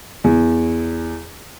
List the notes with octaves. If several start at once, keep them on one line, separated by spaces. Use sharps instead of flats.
E2